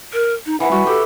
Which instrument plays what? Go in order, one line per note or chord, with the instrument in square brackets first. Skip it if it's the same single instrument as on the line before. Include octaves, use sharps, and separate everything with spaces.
[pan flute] A#4
D#4
[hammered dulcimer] E3 B4 [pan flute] F#5
[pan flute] G3 [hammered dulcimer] F#4
[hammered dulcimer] G4 [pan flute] A4